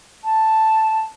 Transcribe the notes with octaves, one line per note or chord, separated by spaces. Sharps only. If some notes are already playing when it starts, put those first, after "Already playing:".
A5